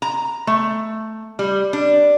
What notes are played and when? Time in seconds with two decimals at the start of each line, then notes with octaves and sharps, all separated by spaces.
0.02 A#5
0.47 A3
1.39 G3
1.73 D4